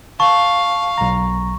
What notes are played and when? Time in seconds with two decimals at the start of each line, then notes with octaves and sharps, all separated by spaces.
0.20 F5 A5 C#6
0.98 B1 A#5